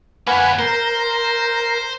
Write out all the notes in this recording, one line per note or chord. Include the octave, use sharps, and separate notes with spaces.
A#3 B4 C#5 F#5 G#5
A#4 C5